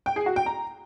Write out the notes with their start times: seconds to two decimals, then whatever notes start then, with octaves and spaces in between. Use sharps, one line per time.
0.06 G5
0.16 G#4
0.26 F#4
0.36 G5
0.46 A#5